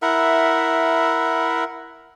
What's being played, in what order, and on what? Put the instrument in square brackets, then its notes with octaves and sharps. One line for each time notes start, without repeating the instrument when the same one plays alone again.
[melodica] E4 A#4 E5 F#5